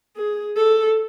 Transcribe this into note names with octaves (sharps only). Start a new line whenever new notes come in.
G#4
A4